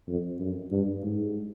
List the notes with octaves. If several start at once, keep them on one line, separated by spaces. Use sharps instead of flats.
F2
F#2
G2
G#2